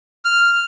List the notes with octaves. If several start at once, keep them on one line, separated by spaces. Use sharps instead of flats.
F6